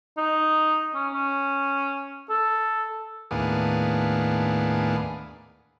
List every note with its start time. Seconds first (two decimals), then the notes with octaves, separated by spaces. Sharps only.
0.18 D#4
0.95 C#4
1.14 C#4
2.30 A4
3.31 D#2 A2 B3 D4 G#4 F5